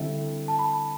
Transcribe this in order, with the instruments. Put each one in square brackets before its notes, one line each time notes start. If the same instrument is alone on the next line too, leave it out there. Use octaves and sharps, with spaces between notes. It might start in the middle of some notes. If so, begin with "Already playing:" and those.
Already playing: [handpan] D3 G3 C4 E4 A4 [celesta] E5
[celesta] A5
B5